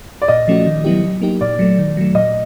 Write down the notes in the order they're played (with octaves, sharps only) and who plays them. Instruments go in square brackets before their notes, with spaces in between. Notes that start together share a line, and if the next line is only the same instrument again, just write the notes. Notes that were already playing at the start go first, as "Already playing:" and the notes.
[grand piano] D5
[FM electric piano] A#2 [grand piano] D#5
[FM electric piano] F3 A3 C#4 F#4
D#3
F#3 B3 E4 G4
F#3
A#3 D#4 G4
[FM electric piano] A#2 [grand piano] D5
[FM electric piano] F#3 A3
D#3
F#3 A3
[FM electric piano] A#2 [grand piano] D#5